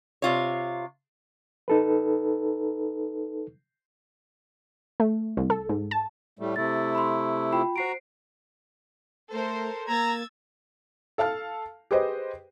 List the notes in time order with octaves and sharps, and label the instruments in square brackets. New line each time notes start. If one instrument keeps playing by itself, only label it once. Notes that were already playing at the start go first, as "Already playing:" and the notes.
[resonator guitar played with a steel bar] C3 F4 C#5
[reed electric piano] D#4 A4 B4
[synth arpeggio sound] A3
C2
A4
G#2
A5
[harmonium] A2 G3 A3
[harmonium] C3 A3 E4 [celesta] A6
[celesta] B5 C6
F4 G5 B5
[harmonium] F#4 A#5 [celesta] C5 C7 D7
[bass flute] A3 [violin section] A4 A#4 C5
[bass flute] A#3 [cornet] A#5 [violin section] E6 G#6 A6
[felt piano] A4 F5 A5 F6
G4 G#4 B4 C5 D#5